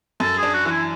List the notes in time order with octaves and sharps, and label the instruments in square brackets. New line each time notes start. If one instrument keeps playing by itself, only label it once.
[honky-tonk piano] F#2 [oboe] A4
[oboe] G#4
[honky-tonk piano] D4
[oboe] F#4
[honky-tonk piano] E3 [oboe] F#4
[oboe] E4